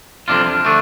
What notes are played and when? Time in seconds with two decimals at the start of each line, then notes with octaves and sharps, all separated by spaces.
0.28 F2 C3 G3 D4 F4
0.65 D3 A3 D4